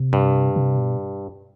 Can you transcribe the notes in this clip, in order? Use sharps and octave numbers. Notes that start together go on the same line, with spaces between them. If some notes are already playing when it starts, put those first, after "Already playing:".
Already playing: C3
G2
C3
B2